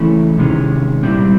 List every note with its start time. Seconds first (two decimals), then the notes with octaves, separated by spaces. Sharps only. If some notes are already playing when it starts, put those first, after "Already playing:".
Already playing: C#3 E3 A3 C#4 E4
0.38 C3 D#3 G#3 C#4
1.03 A#2 G3 C4 E4